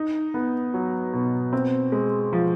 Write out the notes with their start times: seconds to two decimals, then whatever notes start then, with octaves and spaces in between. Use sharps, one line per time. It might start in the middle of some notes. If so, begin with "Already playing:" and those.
Already playing: D#4
0.34 B3
0.74 F#3
1.13 B2
1.53 C4
1.92 G#3
2.33 F3